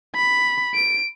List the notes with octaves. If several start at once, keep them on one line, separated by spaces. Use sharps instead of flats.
B5
D7